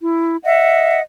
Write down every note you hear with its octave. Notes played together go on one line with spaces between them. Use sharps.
E4
D#5 E5 F#5